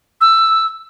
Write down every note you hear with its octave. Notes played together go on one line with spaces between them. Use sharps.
E6